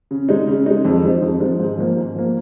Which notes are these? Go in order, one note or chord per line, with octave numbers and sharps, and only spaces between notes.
C#3
G#3 D#4
C#3
G#3 D#4
F2
F3 G#3 D#4
F2
F3 G#3 D#4
G#2
F3 A#3
G#2
F3 A#3